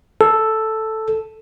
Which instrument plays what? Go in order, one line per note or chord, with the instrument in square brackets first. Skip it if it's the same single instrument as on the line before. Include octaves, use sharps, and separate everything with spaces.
[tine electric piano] A4